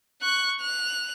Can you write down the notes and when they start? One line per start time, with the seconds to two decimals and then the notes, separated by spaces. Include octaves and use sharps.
0.22 C#6 F#6
0.61 F#6 F7